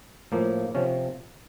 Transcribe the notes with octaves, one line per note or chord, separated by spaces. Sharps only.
A2 F3 A#3
C3 F3 C#4